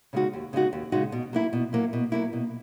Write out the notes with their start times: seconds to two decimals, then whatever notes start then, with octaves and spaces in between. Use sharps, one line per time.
0.13 C#3 G#3 D#4 F#4
0.33 D#2
0.53 C#3 G#3 D#4 F#4
0.73 D#2
0.92 C#3 G#3 D#4 F#4
1.12 B2
1.33 F#3 A#3 E4
1.53 B2
1.73 F#3 A#3 E4
1.93 B2
2.12 F#3 A#3 E4
2.33 B2